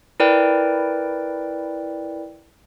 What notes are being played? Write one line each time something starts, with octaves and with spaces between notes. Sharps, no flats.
E4 A#4 B4 D5 G5